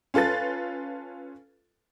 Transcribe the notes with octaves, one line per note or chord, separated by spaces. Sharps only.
C#4 F4 A4 B4 A6